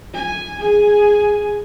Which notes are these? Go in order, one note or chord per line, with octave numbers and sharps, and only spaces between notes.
G#5
G#4 G#5